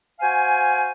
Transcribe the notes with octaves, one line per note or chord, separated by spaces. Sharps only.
F#4 C5 F5 G#5